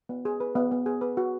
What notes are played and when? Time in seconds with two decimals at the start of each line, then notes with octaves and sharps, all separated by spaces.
0.09 B3
0.25 G#4
0.40 B4
0.55 B3
0.72 B3
0.86 G#4
1.01 B4
1.17 F#4